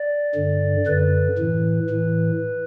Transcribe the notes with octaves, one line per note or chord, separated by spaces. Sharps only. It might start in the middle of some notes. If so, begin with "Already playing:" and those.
Already playing: D5
G2 D3
F#2 D3 B4
A2 E3
A2 E3